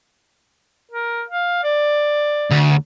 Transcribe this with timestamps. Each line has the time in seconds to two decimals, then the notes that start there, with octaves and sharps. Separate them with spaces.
0.91 A#4
1.29 F5
1.63 D5
2.51 D2